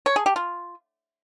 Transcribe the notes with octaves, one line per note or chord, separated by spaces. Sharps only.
C#5
G#4
G4
F4